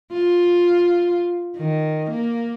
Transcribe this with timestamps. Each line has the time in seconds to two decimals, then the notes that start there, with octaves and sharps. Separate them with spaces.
0.13 F4
1.56 D#3
2.10 A#3